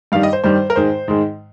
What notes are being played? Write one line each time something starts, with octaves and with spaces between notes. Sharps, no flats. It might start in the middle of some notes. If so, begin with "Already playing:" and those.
G2 D#3 G3 F5
D#5
C5
G2 D#3 G3 C5
A#4
G#2 D#3 G#3 C5
G#2 D#3 G#3